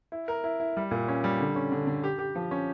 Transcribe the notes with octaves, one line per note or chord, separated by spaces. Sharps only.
E4
A#4
E4
E4
G3
A#2
C#4
G3
D3
C#4
D3
D3
G4
G4
F3
C#4